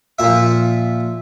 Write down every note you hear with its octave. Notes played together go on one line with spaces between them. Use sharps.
A#2 F3 E5